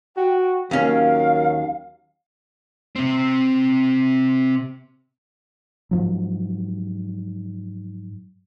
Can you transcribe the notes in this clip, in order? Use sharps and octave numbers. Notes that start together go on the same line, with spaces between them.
F#4 G5
D#2 F#3 C#4 A#4 F5
C3 C4
G#2 F3 F#3